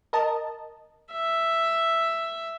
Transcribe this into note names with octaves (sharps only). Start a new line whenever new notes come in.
A#4 D#5 A5
E5